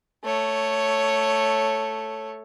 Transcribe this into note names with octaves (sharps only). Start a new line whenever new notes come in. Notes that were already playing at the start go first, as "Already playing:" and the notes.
A3 C#5